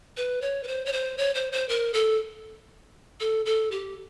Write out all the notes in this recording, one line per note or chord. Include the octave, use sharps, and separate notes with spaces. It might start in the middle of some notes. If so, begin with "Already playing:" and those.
B4
C#5
B4
C5
C#5
C5
C#5
C5
C5
A#4
A4
A4
A4
G4